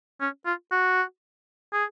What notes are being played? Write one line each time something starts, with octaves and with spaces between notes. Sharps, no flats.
C#4
F4
F#4
G#4